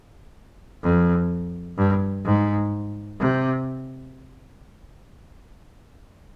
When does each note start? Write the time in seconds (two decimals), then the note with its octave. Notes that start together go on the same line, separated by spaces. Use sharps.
0.83 F2
1.78 G2
2.25 G#2
3.20 C3